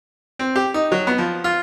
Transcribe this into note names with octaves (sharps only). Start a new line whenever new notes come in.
C4
G4
D#4
F#3
B3
F3
F4